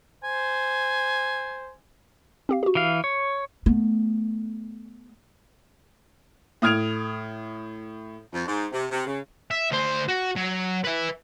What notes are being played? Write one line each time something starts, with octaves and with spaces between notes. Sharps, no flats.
C5 G#5
C4 G4 F5
F#4 G4
E3 F5
C#5
A3 B3
A2 D#6 F6 G#6 D7 F7
F2
G#2
C3
C3
C#3
E5
D2 C5
F#4
F#3
B4 E5